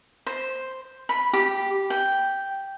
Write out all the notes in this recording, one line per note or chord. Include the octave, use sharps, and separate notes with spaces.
C5
B5
G4
G5